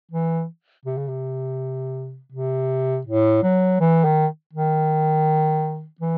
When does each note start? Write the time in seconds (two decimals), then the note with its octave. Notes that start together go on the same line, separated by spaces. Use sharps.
0.12 E3
0.86 C3
0.97 C#3
1.08 C3
2.32 C3
3.07 A2
3.43 F#3
3.80 E3
4.05 D#3
4.53 D#3
6.01 E3